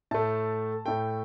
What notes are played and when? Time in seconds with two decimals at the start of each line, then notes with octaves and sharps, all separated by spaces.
0.11 A2 A3 A5
0.86 A2 A3 G5